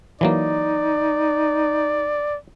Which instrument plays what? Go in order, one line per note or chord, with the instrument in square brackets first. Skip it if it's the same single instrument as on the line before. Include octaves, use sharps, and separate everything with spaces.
[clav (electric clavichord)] E3 F#3 A#3 [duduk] D#4 [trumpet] D5